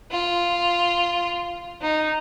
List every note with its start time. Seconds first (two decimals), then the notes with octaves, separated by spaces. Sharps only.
0.11 F4
1.81 D#4